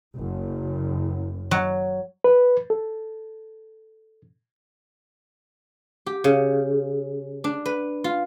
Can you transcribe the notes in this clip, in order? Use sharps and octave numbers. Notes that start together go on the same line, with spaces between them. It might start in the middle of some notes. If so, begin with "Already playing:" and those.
F#1
F#3
B4
A4
G4
C#3
D4
B4
F4